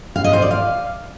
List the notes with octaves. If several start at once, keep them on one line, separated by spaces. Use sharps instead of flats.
F5
D#5
C5
D5
F5